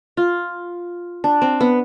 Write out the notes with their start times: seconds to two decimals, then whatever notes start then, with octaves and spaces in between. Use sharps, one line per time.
0.17 F4
1.24 D4
1.42 C4
1.60 B3